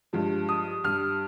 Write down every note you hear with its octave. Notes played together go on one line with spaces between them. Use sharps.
G2 F3 G#3
D#6
G2 G3 F6